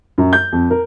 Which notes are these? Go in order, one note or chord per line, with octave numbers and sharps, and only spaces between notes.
F#2
G6
F2
A#4